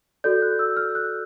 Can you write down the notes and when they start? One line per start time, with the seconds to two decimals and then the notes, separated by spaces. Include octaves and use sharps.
0.24 F#4 A4 D5 G6
0.42 F#6
0.59 E6
0.77 F6
0.95 F#6